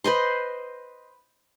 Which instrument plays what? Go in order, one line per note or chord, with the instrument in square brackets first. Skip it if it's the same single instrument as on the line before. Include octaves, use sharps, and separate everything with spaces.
[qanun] B4 C5 D#5 C6